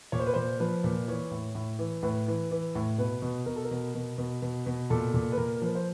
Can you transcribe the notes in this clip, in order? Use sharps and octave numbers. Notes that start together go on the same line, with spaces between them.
A#2 C#5
C5
B4
A#2 C5
F3 B4
A#2
E3 C#5
A2
A2
E3
A2 B4
E3
E3
A2
B2 B4
B2
B2 A#4
A4
A#4
B2
B2
B2
B2
B2
A#2 A4
A#2
B4
A#2 A#4
F3 B4
C5